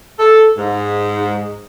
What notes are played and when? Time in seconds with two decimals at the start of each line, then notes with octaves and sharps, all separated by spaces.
0.18 A4
0.57 G#2